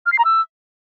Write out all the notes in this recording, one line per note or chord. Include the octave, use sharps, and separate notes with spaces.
F6
C7
A#5
E6